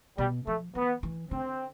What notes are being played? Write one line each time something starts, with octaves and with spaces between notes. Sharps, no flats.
B2 G3
F3 A3
E3 B3
E3
D3 C4